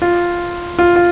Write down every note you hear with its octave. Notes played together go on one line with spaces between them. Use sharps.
F4
F4
F4